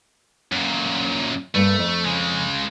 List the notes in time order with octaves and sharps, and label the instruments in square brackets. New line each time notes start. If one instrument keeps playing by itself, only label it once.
[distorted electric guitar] F#2 A#2
[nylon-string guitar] G2 A#3 [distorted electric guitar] A3
[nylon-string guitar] F2
[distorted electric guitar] C#3 G#3